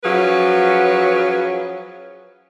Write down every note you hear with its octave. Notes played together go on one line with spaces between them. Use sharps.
F3 F#3 C#4 G#4 B4